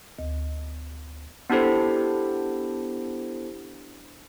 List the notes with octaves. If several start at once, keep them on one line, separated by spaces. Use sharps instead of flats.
D2
B3 D4 E4 G4 A4 C5